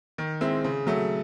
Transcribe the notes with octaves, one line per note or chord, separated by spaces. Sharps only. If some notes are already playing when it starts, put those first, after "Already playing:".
D#3
G#3 C4 E4
C#3
F#3 A3